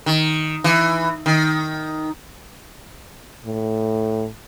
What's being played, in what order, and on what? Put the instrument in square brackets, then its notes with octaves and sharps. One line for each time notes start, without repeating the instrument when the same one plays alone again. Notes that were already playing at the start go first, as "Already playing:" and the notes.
[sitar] D#3
E3
D#3
[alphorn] A2